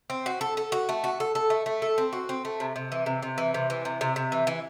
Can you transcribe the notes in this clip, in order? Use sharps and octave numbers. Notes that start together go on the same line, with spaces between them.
C4
F#4
A4
A4
F#4
A3
F#4
A4
A4
A3
A3
A4
C4
F#4
C4
A3
C3
C3
E3
C3
C3
E3
C3
E3
C3
C3
C3
E3
E3